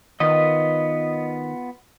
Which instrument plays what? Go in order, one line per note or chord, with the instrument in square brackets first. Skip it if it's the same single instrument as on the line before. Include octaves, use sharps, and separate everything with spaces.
[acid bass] D#3 [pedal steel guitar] B3 F4 B4 [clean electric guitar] D#5